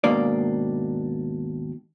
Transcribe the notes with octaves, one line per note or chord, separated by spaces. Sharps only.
D#2 G#2 B2 A#3 D4 D5